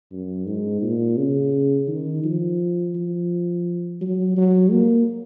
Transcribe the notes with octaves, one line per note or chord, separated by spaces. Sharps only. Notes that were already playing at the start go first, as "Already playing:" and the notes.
F#2
G#2
A#2
C#3
D#3
F3
F3
F#3
F#3
A#3